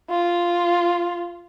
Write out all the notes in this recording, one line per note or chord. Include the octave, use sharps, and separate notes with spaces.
F4